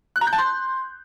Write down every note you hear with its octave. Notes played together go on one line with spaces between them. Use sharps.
F#6
A#5
G6
A5
C6